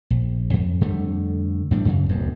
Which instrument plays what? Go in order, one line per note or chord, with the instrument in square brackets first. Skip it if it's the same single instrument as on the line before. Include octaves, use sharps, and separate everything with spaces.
[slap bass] A#1
F2
F2 D3 G3 A3
E2 A2 G3 D4
F#2 C#3
D1 B1 F#2